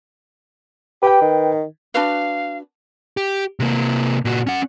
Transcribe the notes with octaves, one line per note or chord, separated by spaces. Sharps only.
G4 B4 G5
D#3
D4 F#4 B4 F5
G4
C3 A#3
A#2 F#4
C#4 F#5